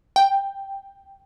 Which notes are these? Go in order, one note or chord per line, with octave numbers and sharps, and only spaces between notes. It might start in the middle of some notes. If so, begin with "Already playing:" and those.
G5